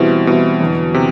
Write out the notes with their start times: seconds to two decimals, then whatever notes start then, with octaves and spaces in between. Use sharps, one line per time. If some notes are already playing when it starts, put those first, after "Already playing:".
Already playing: B2 E3 G3 C4 E4
0.26 B2 E3 G3 C4 E4
0.60 E2 D3 F#3
0.94 C3